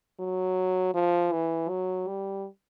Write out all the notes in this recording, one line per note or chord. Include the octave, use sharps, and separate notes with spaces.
F#3
F3
E3
F#3
G3